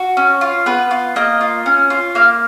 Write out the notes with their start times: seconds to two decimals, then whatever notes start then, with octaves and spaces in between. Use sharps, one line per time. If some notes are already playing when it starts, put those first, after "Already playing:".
Already playing: F#4
0.17 C#4
0.41 F4
0.66 B3 B4
0.91 F4
1.16 A#3 D#5
1.41 F4
1.66 C#4
1.90 F4
2.15 A#3 F5